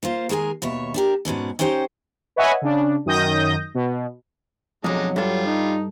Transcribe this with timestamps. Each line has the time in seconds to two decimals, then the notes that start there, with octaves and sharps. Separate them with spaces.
0.03 A#3 F4 C5
0.29 D#3 G#3 G#4 A#4 G#5
0.62 D#2 B2 C#5 E5
0.94 D4 G4 A#4
1.25 G#2 B2 C#4 D4
1.59 C#4 D#4 G4 C5 F#5 G5
2.36 B4 C#5 D#5 E5 F#5 G#5
2.62 C#3 D4
3.06 F#2 D#3 D#6 G6 A#6
3.75 B2
4.84 B1 F2 F#3 G#3 D4 D#4
5.16 G2 G3 F4 A4
5.46 D#4